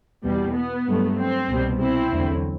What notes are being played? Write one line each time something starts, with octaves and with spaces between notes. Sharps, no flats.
E2 B2 G3
B3
G2 F#3 A3
C4
C2 B2 G3
C4 E4
E2 D3 F#3 A3